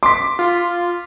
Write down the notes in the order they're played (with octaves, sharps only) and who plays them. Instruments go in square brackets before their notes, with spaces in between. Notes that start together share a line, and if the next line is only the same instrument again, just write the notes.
[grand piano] C6 B6 [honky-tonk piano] D6
[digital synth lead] F4